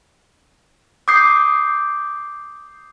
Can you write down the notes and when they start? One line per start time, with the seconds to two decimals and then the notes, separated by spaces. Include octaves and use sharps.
1.08 D6 D#6 G6 C7